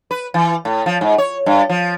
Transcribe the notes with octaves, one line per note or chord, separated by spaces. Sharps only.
B4
E3
A2
F3
G#2
C#5
G2
F3